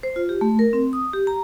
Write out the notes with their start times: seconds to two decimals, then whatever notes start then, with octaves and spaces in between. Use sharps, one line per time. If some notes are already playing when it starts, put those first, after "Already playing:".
0.03 C5
0.16 F4
0.29 G4
0.41 A3
0.59 A#4
0.73 C4
0.93 D#6
1.13 G4
1.27 A#5